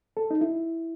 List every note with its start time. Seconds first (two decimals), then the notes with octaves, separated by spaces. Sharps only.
0.17 A4
0.31 D#4
0.41 E4